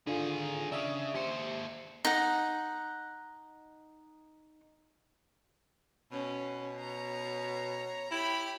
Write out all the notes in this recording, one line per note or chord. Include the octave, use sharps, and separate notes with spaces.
D3 D#3 F4 G#4
C#3 D4 E5 D#6
D#2 G4 C5 E5 C#7
D#4 F#5
B2 C#4
C#5 A#5
E4 G4 B5